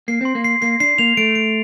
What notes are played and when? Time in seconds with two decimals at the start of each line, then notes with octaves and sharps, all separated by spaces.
0.08 A#3 C7
0.21 C4 C6
0.35 A#3
0.44 C7
0.62 A#3 C7
0.80 D4 C7
0.98 A#3 F7
1.17 A3 D7
1.35 D7